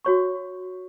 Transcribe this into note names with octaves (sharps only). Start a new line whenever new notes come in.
F#4 C#5 C#6